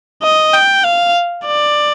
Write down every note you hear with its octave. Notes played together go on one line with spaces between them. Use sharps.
D#5
G5
F5
D5